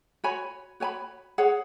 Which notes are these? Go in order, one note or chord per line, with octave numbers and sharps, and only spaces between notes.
F#4 C#5 G#5 B5
F#4 C#5 G#5 B5
G#4 C#5 F#5